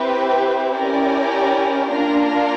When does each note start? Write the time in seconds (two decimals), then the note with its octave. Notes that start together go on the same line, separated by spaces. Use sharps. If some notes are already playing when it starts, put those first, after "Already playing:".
Already playing: C4 E4 G4 B4 E5
0.73 C#4 E4 G4 A#4 D5
1.89 A#3 D4 F4 A#4